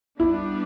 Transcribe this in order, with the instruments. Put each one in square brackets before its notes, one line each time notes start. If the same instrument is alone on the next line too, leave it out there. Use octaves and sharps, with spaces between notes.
[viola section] G3 B3 D4 [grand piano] E4